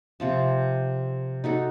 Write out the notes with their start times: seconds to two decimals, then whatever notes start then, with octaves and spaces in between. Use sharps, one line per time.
0.20 C3 F3 A5
1.44 D#4 F#4 A4